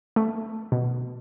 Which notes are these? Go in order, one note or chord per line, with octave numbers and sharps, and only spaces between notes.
A3
B2